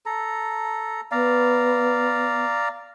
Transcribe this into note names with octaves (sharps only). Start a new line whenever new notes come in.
A4 A#5
B3 D5 F5 A#5